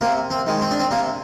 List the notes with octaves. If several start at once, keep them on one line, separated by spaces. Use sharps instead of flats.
C3 A#3
C4
D#3 G#3
C4
D4
C4
C3 A#3